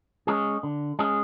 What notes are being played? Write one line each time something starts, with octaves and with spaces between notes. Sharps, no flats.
G#3 C#4 G#4
D3
G#3 C#4 G#4